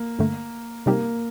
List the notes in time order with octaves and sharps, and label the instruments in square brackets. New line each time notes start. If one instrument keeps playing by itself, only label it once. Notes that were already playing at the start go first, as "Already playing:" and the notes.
Already playing: [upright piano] A#3
[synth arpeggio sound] G2 D3 A3
[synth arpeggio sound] C3 G3 C4 D#4 G4 [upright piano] A#3